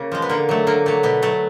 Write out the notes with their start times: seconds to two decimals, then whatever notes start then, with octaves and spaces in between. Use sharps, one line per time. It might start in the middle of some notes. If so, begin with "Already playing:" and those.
Already playing: C#3 A#3
0.12 F3 G#3
0.22 B3
0.29 D3 A#3
0.49 F#3 A3
0.67 D3 A#3
0.86 F#3 A3
1.03 B2 B3
1.22 F#3 A3